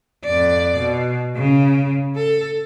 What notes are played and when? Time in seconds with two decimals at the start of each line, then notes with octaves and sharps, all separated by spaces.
0.25 F2 D5
0.78 B2
1.36 C#3
2.16 A4